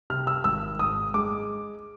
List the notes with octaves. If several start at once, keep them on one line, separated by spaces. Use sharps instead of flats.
C3 F6
E6
G#1 E6
G#2 D#6
G#3 D6